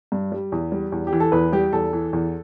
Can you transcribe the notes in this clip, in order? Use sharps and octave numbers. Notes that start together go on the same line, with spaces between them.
G2
G3
E2
G3
E2
G4
E3
A4
E2 B4
G3 G4
E2 A4
E3
E2